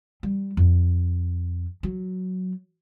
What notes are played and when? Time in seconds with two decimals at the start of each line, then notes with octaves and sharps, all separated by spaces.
0.23 G3
0.57 F2
1.83 F#3